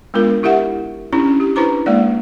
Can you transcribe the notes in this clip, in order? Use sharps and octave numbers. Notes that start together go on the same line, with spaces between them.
G#3 B3 D4 F4 A#4
E4 G4 A#4 E5 F#5
C#4 D4 E4 G4
G4
D4 E4 B4 C5 A#5 D6
G#3 A#3 D5